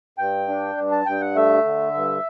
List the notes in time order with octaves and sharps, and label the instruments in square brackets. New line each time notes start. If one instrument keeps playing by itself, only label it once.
[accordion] G2 G5
D4
G2
A5
G2 G5
F#5
A3 E5
D3
G2